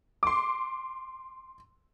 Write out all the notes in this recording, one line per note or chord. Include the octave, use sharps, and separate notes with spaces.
C6 D6